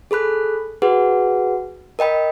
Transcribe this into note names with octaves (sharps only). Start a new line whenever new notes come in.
G#4 A4 B5 F#6
F#4 G#4 B4 F#5
A#4 D#5 G5 B5